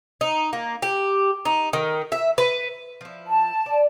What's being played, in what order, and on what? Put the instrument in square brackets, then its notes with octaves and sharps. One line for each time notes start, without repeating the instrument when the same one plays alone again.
[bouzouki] D#4
A#3
G4
D#4
D#3
E5
B4
F3 E4
[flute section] A5
[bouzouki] D5